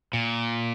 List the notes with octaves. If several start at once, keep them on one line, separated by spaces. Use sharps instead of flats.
A#2